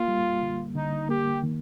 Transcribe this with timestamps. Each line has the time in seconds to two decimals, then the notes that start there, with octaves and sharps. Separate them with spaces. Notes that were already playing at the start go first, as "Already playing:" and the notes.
Already playing: A#3 F4
0.08 G3
0.42 D3
0.75 D3 D#4
1.09 A#3 G4
1.43 D#3